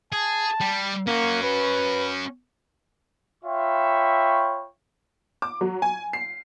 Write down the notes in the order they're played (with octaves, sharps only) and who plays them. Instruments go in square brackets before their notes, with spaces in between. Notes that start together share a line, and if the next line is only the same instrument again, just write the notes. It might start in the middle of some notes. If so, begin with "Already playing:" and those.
[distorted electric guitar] G#4 [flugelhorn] A5
[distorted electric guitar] G3
[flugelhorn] A#3 [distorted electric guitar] C#4 F#4
[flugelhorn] B4
[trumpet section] F4 C#5 E5 G5 B5 C#6
[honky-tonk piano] D6
F#3
G#5
C7